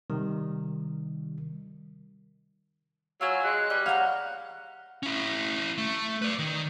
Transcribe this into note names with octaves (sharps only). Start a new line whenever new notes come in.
C3 D#3 G3
F#3 F4 C#5 G#5 E6
G#3 F#6
G3 D#4 B4
C#5 F5 F#5 A#5
C#4 E4
A3
B4 D5
D#3